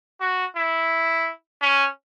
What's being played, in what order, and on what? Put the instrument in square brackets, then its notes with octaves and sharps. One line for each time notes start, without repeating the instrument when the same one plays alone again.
[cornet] F#4
E4
C#4